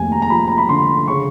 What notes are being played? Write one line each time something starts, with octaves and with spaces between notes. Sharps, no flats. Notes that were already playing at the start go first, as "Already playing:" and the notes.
Already playing: F1 D#2 G#5
A#5
A#5
F3 B5
A#5
B5
D3 C6
C#3 C#6